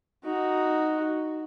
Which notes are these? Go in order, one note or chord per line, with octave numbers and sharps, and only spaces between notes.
D#4 F#4